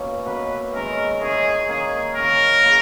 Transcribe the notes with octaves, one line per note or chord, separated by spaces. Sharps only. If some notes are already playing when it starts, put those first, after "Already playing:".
Already playing: B2 A#3 C#4 E4
B2 A#3 C#4 E4 B4
D#3 G#3 C#4 E4 A#4
D#3 G#3 C#4 E4 G#4
D#3 A#3 C#4 E4 G#4
D#3 A#3 C#4 E4 A#4
C#3 E3 A#3 E4